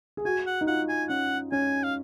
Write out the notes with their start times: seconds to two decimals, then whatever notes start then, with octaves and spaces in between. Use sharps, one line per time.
0.17 G#4
0.25 F#4 G#5
0.47 F#5
0.61 D#4
0.67 F4 F#5
0.89 G#5
1.09 C#4 F#5
1.52 C#4 G#5
1.83 F5